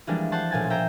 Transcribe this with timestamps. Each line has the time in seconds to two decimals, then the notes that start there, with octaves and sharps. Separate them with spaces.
0.07 E3 F3 G3 G#3 A#3 D4
0.32 C5 F#5 A5 C6
0.51 B1 A#2 F3 G#5 A6
0.70 C5 E5 G5 G#5 A#5